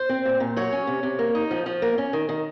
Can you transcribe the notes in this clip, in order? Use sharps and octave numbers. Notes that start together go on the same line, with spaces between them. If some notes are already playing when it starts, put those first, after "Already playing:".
Already playing: C5
C4
A#2
A#2
F#3 C#5
C#4
C3
C3
A#3
D#4
F3
F3
A#3
C#4
D#3
D#3